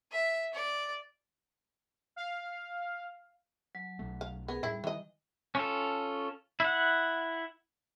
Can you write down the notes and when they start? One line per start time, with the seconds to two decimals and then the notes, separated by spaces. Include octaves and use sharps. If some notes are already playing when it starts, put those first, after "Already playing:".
0.12 E5
0.53 D5
2.16 F5
3.75 F#3
3.99 B1 A3
4.21 F5
4.48 B3 G#4 A#4
4.63 F#2 A2 G3 E4
4.84 D#3 E3 D#5
5.55 C#4 F4 A4
6.60 E4 F#5